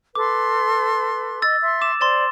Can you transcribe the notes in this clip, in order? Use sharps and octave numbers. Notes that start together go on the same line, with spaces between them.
A4 B4 C6 D6
D#5 E6 A6
E5 C6
D6 E7
C5 D5 C6 A6 E7